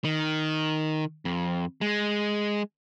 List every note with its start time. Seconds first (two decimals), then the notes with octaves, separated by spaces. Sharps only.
0.04 D#3
1.25 F2
1.81 G#3